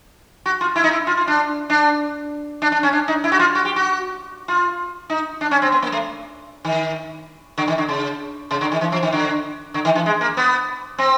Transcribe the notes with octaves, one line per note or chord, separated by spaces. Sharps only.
F#4
F4
E4
D#4
E4
F4
F4
D4
D4
D4
D4
C#4
D4
D#4
E4
F#4
F4
F#4
G4
F#4
F4
D#4
D4
C#4
C4
B3
A#3
A3
D#3
D3
D#3
D3
C#3
C#3
D3
D#3
E3
F3
D#3
D3
D3
D#3
E3
G#3
A#3
B3
C4